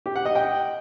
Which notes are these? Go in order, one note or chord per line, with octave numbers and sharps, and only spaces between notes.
G4
F#5
D#5
G5